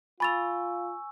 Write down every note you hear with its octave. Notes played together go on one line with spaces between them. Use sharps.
F4 G#5 B5 C#6 E6 A6 F7